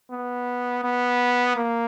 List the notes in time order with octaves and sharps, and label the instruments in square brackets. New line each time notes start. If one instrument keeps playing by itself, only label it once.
[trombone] B3
B3
A#3